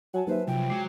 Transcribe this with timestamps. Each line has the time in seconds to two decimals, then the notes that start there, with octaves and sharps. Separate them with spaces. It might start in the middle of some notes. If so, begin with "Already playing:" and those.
0.14 F#3 C#5 F#5 G#5 A5
0.27 D#2 F#3 B4 C5 E5
0.47 C2 F3 F#3 G5
0.70 F#3 G#3 D6 C7